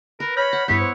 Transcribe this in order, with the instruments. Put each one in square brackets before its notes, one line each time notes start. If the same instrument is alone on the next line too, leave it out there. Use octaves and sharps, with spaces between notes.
[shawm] A#4 [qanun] B4
[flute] C#5 [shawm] B5 [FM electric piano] F6 G6 A#6
[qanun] F#5
[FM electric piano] G2 G6 [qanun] B3 E4 B4 [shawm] C#5 [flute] B6
[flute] C5